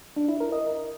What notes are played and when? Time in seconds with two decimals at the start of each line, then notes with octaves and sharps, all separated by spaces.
0.16 D4
0.28 E4
0.40 A#4
0.52 D#5